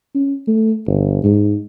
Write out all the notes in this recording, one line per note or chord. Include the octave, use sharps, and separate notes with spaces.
C#4
A3
G1
G#2